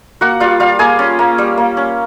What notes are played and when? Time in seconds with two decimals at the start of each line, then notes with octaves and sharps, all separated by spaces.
0.21 A#3 F#4 F#5
0.40 G3 F4 F5
0.60 G3 F4 F5
0.79 A#3 G#4 G#5
0.99 C#4
1.19 A#3
1.38 G3
1.58 A#3
1.77 C#4